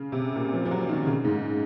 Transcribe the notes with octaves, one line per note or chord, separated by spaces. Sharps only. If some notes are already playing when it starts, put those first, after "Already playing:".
Already playing: C#3
C3
A#2
F3
F3
F#3
D#3
C#3
G#2